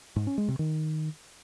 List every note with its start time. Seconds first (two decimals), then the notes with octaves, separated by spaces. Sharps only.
0.16 G#2
0.27 C#4
0.38 G#3
0.48 C3
0.59 D#3